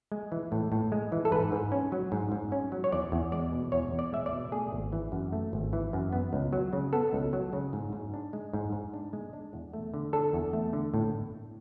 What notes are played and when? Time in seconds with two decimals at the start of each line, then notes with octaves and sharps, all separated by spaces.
0.12 G#3
0.32 E3
0.52 A2
0.72 A2
0.92 G#3
1.12 E3
1.25 A4
1.31 G#2 B4
1.52 G#2
1.72 C#4
1.92 F#3
2.12 G#2
2.32 G#2
2.52 C#4
2.72 F#3
2.84 C#5
2.92 E2 D5
3.12 E2
3.32 G#3 D5
3.52 B2
3.72 E2 C#5
3.92 E2
3.99 D5
4.13 G#3 E5
4.26 D5
4.32 B2
4.52 A3 G#4
4.72 G#1
4.93 E3
5.12 F#2
5.33 A3
5.53 G#1
5.73 E3
5.93 F#2
6.13 B3
6.33 C#2
6.53 F#3
6.73 C#3
6.93 B3 A4
7.13 C#2
7.33 F#3
7.53 C#3
7.73 G#2
7.93 G#2
8.14 D4
8.33 G#3
8.53 G#2
8.73 G#2
8.94 D4
9.13 G#3
9.33 D4
9.53 E2
9.73 A3
9.94 D3
10.13 D4 A4
10.33 E2
10.53 A3
10.73 D3
10.94 A2